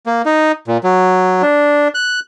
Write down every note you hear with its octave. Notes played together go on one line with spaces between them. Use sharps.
A#3
D#4
A#2
F#3
D4
F#6